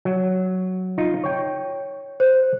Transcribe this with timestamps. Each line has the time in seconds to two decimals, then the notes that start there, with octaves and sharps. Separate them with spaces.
0.05 F#3
0.98 D#4 F4
1.24 C#5 G5
2.20 C5